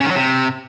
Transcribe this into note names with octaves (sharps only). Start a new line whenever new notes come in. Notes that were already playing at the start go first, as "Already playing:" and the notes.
C#3
D#3
F#3
C3